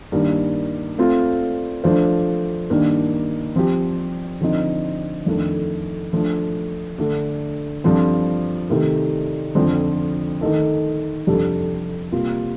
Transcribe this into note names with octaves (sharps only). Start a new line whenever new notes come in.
G2 D#3 A#3
A3 C4 F4
F3 A3 D4 F4 C5
G2 D#3 A#3 D4
F3 C4 G4
D3 F3 C4 D#4
F2 D#3 A3 D4
F3 A3 D4
D3 A3 D4
G2 F3 C4 F4 A4
C3 D#3 A3
F2 D3 F3 C4
D#3 A3 D#4 A4
F2 C3 G3 D4 A4
C3 G3 A#3 F4